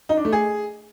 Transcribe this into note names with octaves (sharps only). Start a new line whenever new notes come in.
D#4
D4
A3
G#4